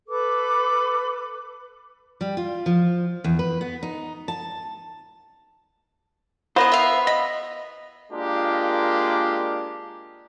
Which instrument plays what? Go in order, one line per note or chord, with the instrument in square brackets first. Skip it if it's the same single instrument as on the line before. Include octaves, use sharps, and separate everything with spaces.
[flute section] A4 B4 D6
[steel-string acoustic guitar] G3
F4
F3
E2
B4
B3
D#4
A5
[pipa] B3 [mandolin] E4 A#4 D#5 [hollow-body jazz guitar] C5
[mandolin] E5 F5
[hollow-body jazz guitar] D#5 [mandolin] B5
[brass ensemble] G#3 A#3 D4 F4 G4 A#4